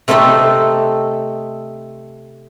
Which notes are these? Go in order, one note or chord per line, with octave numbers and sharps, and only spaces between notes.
C3 A3 C4 D#4 A4